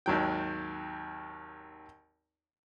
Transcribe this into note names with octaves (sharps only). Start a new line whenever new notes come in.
G#1 D#2 F#3 G5